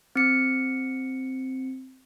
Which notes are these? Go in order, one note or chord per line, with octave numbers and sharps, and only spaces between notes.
C4 C#7